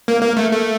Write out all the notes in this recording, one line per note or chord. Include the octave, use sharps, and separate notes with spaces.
A#3
A#3
A3
A3